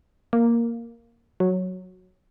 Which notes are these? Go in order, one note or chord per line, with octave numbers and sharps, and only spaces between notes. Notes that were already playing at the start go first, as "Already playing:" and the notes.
A#3
F#3